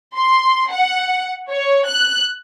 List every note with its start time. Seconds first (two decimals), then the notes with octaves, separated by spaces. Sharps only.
0.16 C6
0.71 F#5
1.50 C#5
1.87 F#6